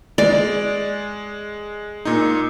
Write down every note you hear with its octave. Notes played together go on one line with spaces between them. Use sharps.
G#3 D5
A#2 D#4